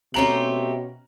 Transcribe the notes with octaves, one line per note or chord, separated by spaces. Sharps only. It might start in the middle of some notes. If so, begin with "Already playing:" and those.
B2 A3 C4 C#4 G4 A#5 F#7